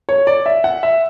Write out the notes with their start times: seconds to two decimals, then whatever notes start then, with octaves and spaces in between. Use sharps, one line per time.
0.09 C#5
0.27 D5
0.46 E5
0.64 F#5
0.83 E5